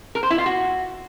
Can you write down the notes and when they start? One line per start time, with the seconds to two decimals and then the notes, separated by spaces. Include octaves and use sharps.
0.15 A#4
0.23 C5
0.30 E4
0.38 F4
0.46 F#4